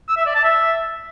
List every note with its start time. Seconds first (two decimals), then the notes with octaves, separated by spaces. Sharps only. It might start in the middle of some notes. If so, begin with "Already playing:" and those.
0.08 E6
0.17 E5
0.26 D5
0.35 A5
0.44 E5